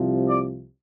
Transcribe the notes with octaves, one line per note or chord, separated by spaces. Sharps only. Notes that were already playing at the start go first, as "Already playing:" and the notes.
Already playing: C2 C3 F3
D5